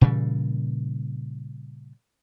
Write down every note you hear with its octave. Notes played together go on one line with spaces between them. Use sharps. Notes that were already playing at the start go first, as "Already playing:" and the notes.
A#2 C#3 E3 G3